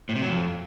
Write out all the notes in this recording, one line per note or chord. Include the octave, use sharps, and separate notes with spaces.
A2
C3
F#3
F2